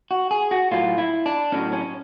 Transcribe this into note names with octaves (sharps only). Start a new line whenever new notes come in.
F#4
G#4
F#4
A2 F#3 F4
E4
D4
A2 F#3 C#4
C#4